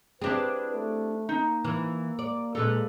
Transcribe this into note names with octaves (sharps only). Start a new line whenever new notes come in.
C4 D4 E4 G4 G#4 B4
A3
A#3 D#4
E3
D5
A#2 G#3 D#4 A4 B4